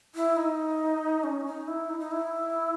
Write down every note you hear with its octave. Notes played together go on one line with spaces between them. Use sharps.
E4
D#4
C#4
D#4
E4
D#4
D#4
E4